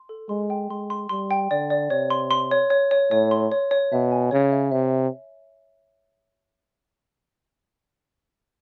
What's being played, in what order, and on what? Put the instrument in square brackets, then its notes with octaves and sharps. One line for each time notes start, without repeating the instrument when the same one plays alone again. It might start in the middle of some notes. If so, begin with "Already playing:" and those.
Already playing: [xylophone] C6
A4
[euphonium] G#3 [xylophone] C6
[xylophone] G5
[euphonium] G#3 [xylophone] C6
[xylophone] C6
[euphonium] G3 [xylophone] C6
[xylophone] G5
[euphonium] D3 [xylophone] D5
[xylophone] D5
[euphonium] C3 [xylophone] C#5
[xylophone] C6
C6
C#5
C#5
C#5
[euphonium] A2 [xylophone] C#5
[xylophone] C6
C#5
C#5
[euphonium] B2 [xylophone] E5
[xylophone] G#5
[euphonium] C#3 [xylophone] C#5
[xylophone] E5
[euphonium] C3 [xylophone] E5